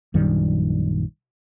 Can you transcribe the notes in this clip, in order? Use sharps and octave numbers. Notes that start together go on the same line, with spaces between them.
A#1 F#2 D#3 G3